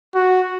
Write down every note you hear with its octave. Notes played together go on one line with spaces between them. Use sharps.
F#4